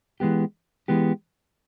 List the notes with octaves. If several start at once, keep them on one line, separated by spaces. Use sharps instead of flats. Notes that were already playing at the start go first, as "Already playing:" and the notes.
E3 G#3 B3 G4
E3 G#3 B3 G4